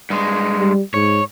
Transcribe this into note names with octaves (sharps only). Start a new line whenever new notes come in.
G2 G#3
G3
G#2 C#5